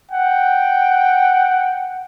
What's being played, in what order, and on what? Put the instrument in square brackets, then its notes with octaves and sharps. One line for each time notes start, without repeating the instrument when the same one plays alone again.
[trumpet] F#5 [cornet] G5